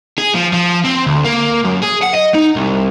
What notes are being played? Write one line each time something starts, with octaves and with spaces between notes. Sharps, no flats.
G#4
F3
F3
C4
D2
A#3
F#2
G#4
F#5
D#5
D#4
C2